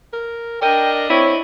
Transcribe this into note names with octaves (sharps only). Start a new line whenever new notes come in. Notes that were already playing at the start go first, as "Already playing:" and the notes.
A#4
D4 A#4 D#5 G5
C4 E4 C#5